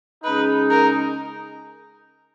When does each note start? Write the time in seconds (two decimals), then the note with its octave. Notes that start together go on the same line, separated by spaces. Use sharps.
0.24 C#3 G#3 D#4 B4
0.71 A#4